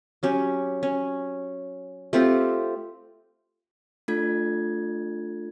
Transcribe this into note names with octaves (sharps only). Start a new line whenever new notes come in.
F#3 C#4 G4
C#4
A3 C4 F4 G4
A3 D4 F4 A4 G#6